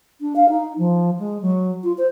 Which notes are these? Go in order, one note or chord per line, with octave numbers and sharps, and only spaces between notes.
D4
F5
D#4
F3
G#3
F#3
F4
C5